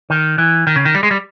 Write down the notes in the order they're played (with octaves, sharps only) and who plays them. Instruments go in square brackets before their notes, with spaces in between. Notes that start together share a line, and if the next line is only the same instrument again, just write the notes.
[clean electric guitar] D#3
E3
D#3
C#3
D#3
G3
G#3
G3